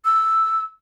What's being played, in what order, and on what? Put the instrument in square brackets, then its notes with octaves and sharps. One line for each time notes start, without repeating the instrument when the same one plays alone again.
[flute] E6